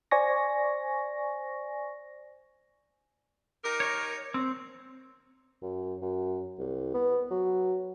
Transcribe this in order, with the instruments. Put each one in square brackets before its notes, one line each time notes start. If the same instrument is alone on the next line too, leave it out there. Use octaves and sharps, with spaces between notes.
[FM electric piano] C5 D5 G#5 C#6 A#6
[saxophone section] D#4 G4 A#4
[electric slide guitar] C#5
C4
[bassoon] F#2
F#2
C2
B3
F#3